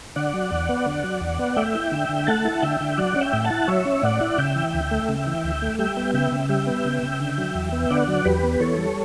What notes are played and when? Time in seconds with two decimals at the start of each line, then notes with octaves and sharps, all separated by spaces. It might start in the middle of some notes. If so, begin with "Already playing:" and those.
0.16 D3 D5 F#5
0.34 F#3
0.52 E2
0.69 B3
0.86 D3
1.04 F#3
1.21 E2
1.39 B3
1.56 A3 E5 G5
1.75 E4
1.92 D3
2.09 D3
2.27 A3 F#5 A5
2.45 E4
2.62 D3 E5 G5
2.81 D3
2.97 F#3 D5 F#5
3.16 C#4
3.21 E5 G5
3.33 A2
3.44 F#5 A5
3.50 E4
3.68 F#3 C#5 E5
3.85 C#4
4.03 A2 D5 F#5
4.21 E4
4.38 C#3 E5 G5
4.56 E3
4.74 D2
4.91 A3
5.09 C#3
5.27 E3
5.44 D2
5.62 A3
5.79 G3 E5 G5
5.97 B3
6.14 C#3 E5 G5
6.32 C#3
6.49 G3 E5 G5
6.67 B3
6.85 C#3
7.03 C#3
7.20 D3
7.38 F#3
7.55 E2
7.72 B3
7.90 D3 D5 F#5
8.08 F#3
8.25 E2 G4 B4
8.43 B3
8.60 E3 A4 C#5
8.78 G3